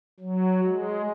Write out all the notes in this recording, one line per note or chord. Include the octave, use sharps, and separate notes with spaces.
F#3
G#3